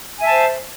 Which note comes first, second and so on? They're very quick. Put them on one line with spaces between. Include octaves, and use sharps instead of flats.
G#5 E5 A5 C5